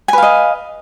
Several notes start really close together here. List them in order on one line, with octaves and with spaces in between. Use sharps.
G#5 B4 F5 D#5